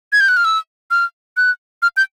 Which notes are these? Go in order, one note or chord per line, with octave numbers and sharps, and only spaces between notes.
G#6
G6
F#6
F6
E6
F6
F#6
F6
G6